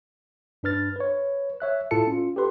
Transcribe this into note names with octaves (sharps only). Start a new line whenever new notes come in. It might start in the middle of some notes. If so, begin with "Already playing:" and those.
G2 D4 B4 F6 A6
B4 C#5
C#5 E5 F#6
A2 E4 F4 A4 A5 C#7
C#4 F4
G4 A4 B4 C6